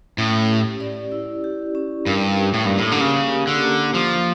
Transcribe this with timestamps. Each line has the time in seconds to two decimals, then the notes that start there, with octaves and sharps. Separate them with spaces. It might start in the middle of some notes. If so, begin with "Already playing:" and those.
0.18 A2 C#4
0.49 G4
0.80 D5
1.12 E4
1.44 G4
1.75 C#4
2.06 G2 A#4
2.37 G4
2.54 A2
2.66 G2 A#3
2.78 A2
2.92 D3
3.00 C#3 C#4
3.32 G4
3.47 D3
3.63 A#3
3.94 F3 A#3